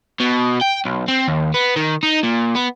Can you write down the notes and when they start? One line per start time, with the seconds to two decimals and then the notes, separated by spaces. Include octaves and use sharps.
0.20 B2
0.61 G5
0.85 B1
1.08 C4
1.28 D#2
1.54 B3
1.76 D#3
2.03 D#4
2.24 A#2
2.56 B3